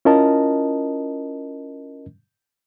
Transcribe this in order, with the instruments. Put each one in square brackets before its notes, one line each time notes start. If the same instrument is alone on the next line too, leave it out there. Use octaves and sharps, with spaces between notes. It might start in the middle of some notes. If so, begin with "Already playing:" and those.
[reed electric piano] C#4 E4 F4 A#4 D#5 A5